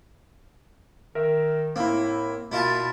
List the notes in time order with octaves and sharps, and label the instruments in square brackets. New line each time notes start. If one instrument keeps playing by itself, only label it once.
[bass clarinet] D#3 [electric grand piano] A#4 E5
[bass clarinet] A2 [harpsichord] A#3 [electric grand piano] C4 E4
[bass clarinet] B2 [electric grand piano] A#3 [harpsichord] E4 F4 A5